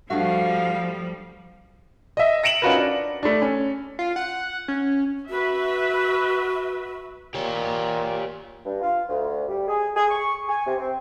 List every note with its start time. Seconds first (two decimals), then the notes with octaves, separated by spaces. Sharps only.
0.10 G2 F3 G3 A3 F#4 F5
2.17 D#5 E5
2.44 A#6 C#7 D7 E7 F#7
2.62 C#4 D#4 F4 F#4 A#4 B4
2.76 D4
3.23 A3 D4
3.42 C#4
3.99 F4
4.16 F#5
4.68 C#4
5.30 F#4 B4 E5
7.35 A#2 G4 C#5
8.65 G2
8.81 F4
9.07 D2
9.48 G3
9.67 G#4
9.96 G#4
10.09 C#6
10.48 G#5
10.66 C3
10.78 C4